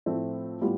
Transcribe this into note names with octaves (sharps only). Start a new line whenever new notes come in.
A2 F3 A3 C4
A2 G3 B3 F4